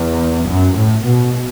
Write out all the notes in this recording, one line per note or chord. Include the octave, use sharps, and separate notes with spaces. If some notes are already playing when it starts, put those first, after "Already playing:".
Already playing: E2
F#2
A2
B2